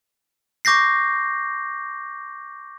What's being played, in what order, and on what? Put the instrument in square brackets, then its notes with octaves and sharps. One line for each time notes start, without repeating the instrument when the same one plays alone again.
[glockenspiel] C#6 D6 G6 A#6 C7